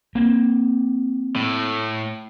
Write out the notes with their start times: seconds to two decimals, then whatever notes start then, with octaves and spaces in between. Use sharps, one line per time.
0.15 A#3 C4
1.36 A2